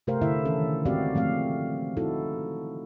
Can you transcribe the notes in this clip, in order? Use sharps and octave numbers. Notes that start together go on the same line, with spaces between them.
C3 A3 G4 A#4 C5 F5
D3 E4 E5
D#3 E3 C#4 A4
G#3 C4 F#4 G4 D5 F5
F3 A3 C4 F5
D#4 E4 F#4 A4